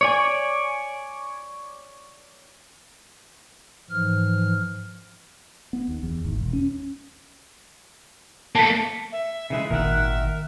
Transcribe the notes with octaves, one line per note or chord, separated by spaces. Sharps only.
C#5 D5 G#5
G#2 E3 F3 F6
B3
D#2
E2
G#1
E1
C#4
A#3 A4 A5 B6
E5
C#3 E3 G#3 E5
G#1 A#2 D#3 A#4 E5 F#5